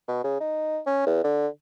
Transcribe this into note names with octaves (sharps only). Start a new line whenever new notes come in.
B2
C#3
D#4
C#4
E2
D3